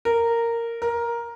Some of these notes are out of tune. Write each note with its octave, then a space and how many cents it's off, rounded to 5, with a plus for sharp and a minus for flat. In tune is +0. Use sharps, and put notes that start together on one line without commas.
A#4 -10
A#4 +10